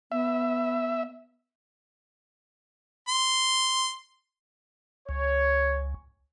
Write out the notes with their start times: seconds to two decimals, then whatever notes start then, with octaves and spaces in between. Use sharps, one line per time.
0.12 B3 E5
3.08 C6
5.09 C#2 C#5